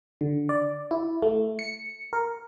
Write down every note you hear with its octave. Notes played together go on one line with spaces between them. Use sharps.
D3
D5
E4
A3
C#7
A#4